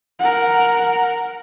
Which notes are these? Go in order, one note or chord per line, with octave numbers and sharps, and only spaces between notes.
A#4 F#5